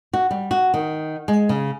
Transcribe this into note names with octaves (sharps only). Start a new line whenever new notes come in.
F#4
G3
F#4
D#3
G#3
C#3